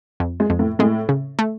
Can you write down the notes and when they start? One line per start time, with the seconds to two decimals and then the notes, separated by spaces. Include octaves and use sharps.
0.20 F2
0.40 G#3
0.50 F2
0.59 A2
0.79 A2 G#3
1.09 C#3
1.39 A3